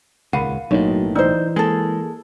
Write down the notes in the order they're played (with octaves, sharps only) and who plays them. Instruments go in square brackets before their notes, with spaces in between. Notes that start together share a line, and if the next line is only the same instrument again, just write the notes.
[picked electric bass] D#1 C#2 [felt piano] A#4 B5 D#7 [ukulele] F5 F#5
[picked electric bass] B1 A2 [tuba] F#3 [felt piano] A#3 D#4 C#5
[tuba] E3 [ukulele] D#4 C5 [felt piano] D5 D#5 E6
[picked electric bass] G#3 [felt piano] A#3 [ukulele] G#4 A4